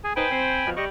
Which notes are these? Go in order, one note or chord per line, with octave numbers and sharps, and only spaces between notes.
G#4 G#5
D#4 B4 C5 G5 G#5 B5
C4 C5
B2 F3
G3 D#5 C#6